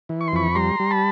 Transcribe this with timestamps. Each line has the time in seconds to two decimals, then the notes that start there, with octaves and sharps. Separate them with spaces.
0.09 E3
0.21 C#6
0.28 C6
0.32 F2 B5 C#6
0.55 G3 A#5 C6
0.80 G3
0.91 A5 B5